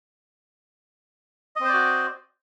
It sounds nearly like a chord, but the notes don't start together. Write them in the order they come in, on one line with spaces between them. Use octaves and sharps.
D#5 C4 C5 D5 F#4